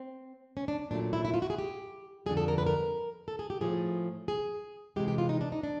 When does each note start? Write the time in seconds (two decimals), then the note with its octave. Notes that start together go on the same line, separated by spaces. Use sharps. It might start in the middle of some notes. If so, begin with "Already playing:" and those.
Already playing: C4
0.57 C#4
0.68 D4
0.91 A#2 F#3 A3 D4
1.13 E4
1.25 E4
1.34 F4
1.42 F#4
1.50 G#4
1.58 G4
2.26 F2 D3 G3 G#4
2.37 A4
2.48 A#4
2.58 B4
2.66 A#4
3.28 A4
3.39 G#4
3.50 G4
3.61 A2 F3 A3 G#4
4.28 G#4
4.96 C3 E3 G#3 G4
5.08 G4
5.18 F4
5.29 D#4
5.41 D4
5.52 D#4
5.63 D4